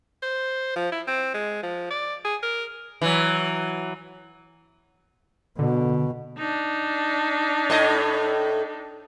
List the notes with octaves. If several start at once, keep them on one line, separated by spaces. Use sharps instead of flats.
C5
F3
E4
C4
G#3
F3
D5
G#4
A#4
E3 F#3
B2 D3
D4 D#4
A2 D#5